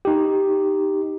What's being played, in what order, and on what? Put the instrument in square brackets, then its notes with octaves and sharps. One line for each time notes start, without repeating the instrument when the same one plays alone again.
[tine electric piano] D#4 G4